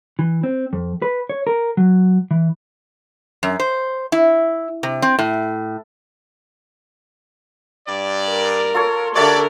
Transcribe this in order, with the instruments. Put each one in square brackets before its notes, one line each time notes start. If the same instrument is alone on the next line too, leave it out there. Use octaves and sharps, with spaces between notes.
[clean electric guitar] E3
C4
F2
B4
C#5
A#4
F#3
E3
[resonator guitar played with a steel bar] F#2
C5
E4
C3
C4
A2
[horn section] G2 D5
[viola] A#4
[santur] F4 A4 C#5
[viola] D3 A#4 [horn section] F#4 G4 D5 [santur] C#5 E5 A5